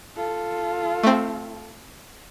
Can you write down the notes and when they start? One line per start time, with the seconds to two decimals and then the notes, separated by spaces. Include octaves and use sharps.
0.16 F4 A4
1.03 A3 C4